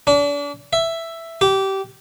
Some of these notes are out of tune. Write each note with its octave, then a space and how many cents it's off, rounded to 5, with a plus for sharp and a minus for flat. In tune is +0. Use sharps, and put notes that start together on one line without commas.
D4 -35
E5 +5
G4 -20